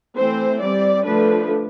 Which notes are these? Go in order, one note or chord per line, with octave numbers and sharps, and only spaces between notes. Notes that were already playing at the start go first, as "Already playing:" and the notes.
E3 A3 C4 C5
G3 C4 D5
D3 F3 A3 D4 B4